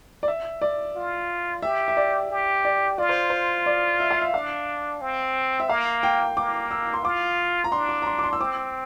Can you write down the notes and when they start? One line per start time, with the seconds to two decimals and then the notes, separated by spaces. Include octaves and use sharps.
0.23 D5
0.28 E5
0.62 D5
0.96 F4
1.63 G4 E5
1.88 E5
1.97 D5
2.30 G4
2.65 D5
2.98 F4 D5
3.09 C5
3.30 C5
3.66 D5
4.00 E5
4.11 F5
4.22 E5
4.34 D4 F5
5.01 C4
5.60 E5
5.69 A#3 F5
6.03 G5
6.37 A#3 D6
6.71 E6
6.94 C6
7.04 F4 D6
7.64 A#5
7.72 D4 C6
7.89 D6
8.02 A#5
8.06 C6
8.19 D6
8.24 C6
8.33 E6
8.40 C4 D6